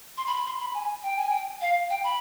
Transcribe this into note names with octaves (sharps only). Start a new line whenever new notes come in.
C6
B5
B5
C6
B5
G#5
G5
G#5
G5
F5
G5
B5